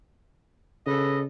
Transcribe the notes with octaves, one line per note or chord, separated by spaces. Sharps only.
C#3 A4 B4 D#5